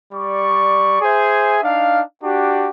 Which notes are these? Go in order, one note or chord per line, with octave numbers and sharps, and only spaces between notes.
G3 D5 C#6
G#4 C5 E5 G#5
D4 D#4 F5
D4 F#4 G4